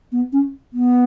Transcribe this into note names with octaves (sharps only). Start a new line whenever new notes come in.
B3
C#4
B3